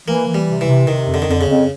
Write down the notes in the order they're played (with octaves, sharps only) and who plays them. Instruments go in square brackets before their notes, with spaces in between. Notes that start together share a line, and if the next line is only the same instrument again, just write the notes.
[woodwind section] E3 [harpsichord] A#3
[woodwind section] E3
[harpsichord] G3
[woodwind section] C3
[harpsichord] E3
[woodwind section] C3
[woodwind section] C3 [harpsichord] D#3
[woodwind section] F2
[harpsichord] D3
D#3
[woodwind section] F2 [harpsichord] D3
[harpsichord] C#3
[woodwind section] F2